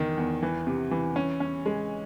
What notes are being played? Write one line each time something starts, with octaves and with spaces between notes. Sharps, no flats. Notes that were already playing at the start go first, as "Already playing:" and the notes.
Already playing: E2 D#3
E2
E3
C3
E3
C#4
C#4
G#3